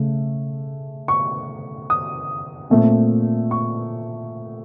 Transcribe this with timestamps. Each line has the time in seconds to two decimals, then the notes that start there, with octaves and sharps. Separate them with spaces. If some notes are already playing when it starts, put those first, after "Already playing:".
Already playing: C#3 A3
1.08 C#6
1.90 D#6
2.70 A#2 A3 C4
3.51 C#6